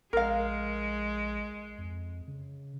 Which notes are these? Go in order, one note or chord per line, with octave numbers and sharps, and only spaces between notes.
A#1 G#3 A#4 F5
F2
C#3